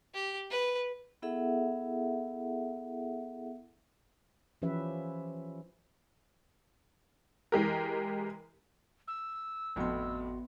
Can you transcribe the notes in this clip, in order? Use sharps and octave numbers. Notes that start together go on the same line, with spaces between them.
G4
B4
B3 E4 G#4 A4 E5 F#5
E3 F3 C#4 G4 B4 E5
E3 G#3 G4 A#4
E6
G#1 F2 A2 B3 D4 E4 F#4 C6